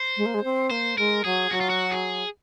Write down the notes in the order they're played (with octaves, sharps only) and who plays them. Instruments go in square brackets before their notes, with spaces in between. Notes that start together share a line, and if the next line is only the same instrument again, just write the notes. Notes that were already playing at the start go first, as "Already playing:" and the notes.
Already playing: [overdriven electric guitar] C5
[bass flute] G#3
A#3
G#3
C4
[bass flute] A#3 [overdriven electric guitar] C5
[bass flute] G#3 [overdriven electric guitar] A#4
[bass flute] F#3 [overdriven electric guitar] G#4
[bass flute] F#3 [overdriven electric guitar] F#4
[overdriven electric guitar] F4
F#4
G#4